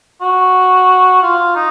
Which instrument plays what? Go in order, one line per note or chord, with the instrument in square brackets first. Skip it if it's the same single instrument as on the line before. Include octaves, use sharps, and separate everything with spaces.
[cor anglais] F#4
F4
D#4